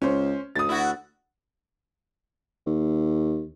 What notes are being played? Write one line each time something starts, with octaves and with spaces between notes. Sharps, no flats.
C#2 C#4 C5
D2 D#6 A6
E4 F#4
D#2